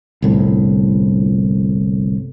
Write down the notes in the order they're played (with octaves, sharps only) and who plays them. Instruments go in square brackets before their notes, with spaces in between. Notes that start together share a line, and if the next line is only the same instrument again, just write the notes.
[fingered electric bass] G1 C2 A2